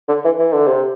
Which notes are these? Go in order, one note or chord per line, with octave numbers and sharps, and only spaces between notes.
D3
E3
E3
D3
C3